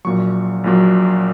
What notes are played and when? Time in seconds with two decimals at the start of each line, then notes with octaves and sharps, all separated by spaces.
0.05 A#1 A#2 F#3 C#6
0.64 A#1 A#2 F#3